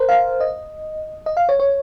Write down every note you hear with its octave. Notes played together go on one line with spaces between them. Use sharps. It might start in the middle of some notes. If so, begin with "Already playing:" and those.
Already playing: A#4 C5
F5
D#5
D#5
F5
C#5
C#5